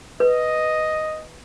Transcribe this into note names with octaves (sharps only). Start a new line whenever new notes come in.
B4 D#5